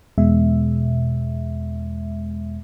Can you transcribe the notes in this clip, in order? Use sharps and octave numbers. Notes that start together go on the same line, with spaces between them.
E2 B2 G#3 E5